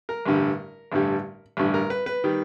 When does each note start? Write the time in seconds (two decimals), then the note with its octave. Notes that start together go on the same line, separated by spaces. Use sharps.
0.09 A#4
0.26 A1 G2 D3 G3
0.92 A1 G2 D3 G3
1.57 A1 G2 D3 G3
1.74 A#4
1.90 B4
2.06 B4
2.24 D#3 G3